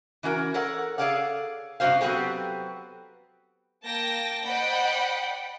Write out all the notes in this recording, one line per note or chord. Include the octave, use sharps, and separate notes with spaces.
E3 C#4 F#4 A#4
A4 A#4 C#5 F#5
G#4 A4 C#5 D5 F5 F#5
G2 C3 G#3 F#4 C5 F5
F#3 B3 C4 F#4 G4 A4
A#3 G5 A5 A#6
C5 D5 D#5 F#5 G5 B5